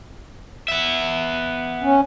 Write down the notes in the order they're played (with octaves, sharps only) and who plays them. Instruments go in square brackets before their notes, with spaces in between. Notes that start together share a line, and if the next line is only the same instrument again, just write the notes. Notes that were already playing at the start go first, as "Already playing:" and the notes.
[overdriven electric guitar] B3 E5
[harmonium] C#4